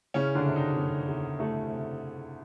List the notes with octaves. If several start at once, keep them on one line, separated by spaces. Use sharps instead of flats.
C#3 E3 C#4
D3 D4
C3
D#3 D#4
F#1
E2
E3 A3 A4
C3